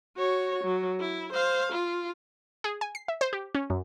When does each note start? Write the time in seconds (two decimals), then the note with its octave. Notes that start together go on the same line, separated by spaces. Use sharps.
0.17 F#4 C#5
0.64 F#3
1.00 E4
1.33 C5 F5
1.72 F4
2.64 G#4
2.81 G#5
2.95 C7
3.08 E5
3.21 C5
3.33 G4
3.55 C#4
3.70 F#2